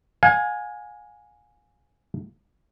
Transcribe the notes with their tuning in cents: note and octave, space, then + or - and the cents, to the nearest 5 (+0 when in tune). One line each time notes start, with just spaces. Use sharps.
F5 +40 G#5 +0